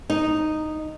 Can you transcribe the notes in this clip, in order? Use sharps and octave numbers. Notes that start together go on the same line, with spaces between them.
D#4